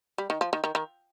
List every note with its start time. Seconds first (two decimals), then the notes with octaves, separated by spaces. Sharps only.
0.18 G3
0.30 D#3
0.41 F3
0.53 D#3
0.64 D#3
0.75 D#3